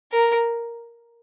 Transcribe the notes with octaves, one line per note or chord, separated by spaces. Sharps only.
A#4